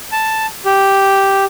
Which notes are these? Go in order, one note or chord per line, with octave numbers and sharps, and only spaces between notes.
A5
G4